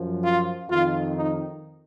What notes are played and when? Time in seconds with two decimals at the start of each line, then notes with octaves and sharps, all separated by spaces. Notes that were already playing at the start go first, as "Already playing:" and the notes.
Already playing: F#2 F3
0.25 F4
0.70 F2 D#3 F4
1.16 D#4